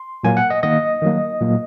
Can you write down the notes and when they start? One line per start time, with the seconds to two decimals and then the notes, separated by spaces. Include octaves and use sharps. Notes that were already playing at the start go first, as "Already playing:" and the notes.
Already playing: C6
0.24 A#2 F#3 A#3 G#5
0.37 F#5
0.50 D#5
0.63 D#3 A#3 D#5
1.02 D#3 F#3 A#3
1.41 A#2 F#3 A#3